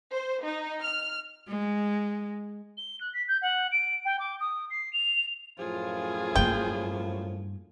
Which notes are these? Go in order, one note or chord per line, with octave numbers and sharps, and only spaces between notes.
C5
D#4
F6
G#3
G7
F#6
B6
G6
F#5
D7
G5
D6
D#6
C7
F7
F#2 A2 F3 F4 G#4
G2 A#3 G5